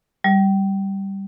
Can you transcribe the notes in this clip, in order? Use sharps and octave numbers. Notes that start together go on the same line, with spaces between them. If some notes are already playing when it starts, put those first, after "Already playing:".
G3